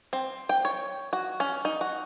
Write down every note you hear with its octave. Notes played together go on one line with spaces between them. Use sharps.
C4
G5
C#5
F#4
C#4
D#4
F#4